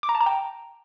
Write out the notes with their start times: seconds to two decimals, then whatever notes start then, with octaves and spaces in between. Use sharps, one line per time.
0.03 D6
0.09 A#5
0.15 A5
0.21 A#5
0.26 G5